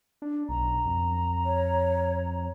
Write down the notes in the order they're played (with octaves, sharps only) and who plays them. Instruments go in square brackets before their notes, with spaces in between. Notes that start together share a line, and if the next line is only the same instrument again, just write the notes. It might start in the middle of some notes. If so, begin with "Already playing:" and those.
[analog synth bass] D4
[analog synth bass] B1 [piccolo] A#5
[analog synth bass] F2
[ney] C#5